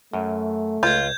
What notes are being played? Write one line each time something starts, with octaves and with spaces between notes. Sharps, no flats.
F#2 A3
C#2 F4 G6 G#6